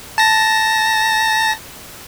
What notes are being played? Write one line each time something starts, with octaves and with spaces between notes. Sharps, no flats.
A5 A#6